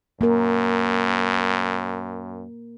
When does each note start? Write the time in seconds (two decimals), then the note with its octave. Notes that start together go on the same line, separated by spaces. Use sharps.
0.21 F#2 A#3 A#4